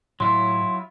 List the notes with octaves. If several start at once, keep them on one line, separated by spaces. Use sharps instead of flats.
A2 F#3 E4 F4 C6